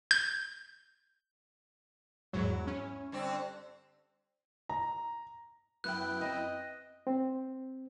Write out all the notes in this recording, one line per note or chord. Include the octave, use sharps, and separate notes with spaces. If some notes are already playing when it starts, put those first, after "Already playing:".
G6
E2 G#2 F#3 E4
C#4
G2 D3 C4
A#5
F#2 B3 E4 G5 F#6
C4 D#5
C4